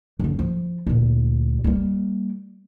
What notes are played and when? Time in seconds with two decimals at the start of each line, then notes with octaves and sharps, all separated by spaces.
0.19 F#2 D3
0.39 F3 E4
0.87 D2 A#2
1.64 G3 A#3